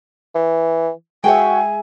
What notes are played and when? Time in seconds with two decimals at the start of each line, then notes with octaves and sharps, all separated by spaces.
0.35 E3
1.24 G#3 F#4 G#4 C#5 E5 G5 G#5